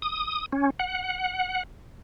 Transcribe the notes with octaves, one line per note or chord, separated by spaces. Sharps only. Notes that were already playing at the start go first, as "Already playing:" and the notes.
D#6
C#4
F#5